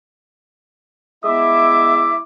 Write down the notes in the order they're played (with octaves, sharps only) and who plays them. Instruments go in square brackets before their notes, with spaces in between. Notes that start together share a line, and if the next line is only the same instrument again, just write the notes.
[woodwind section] G#3 B3 E5 [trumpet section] E4 D6